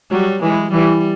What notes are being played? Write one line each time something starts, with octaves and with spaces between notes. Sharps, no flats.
F#3 G3
E3 G#3
E3 G3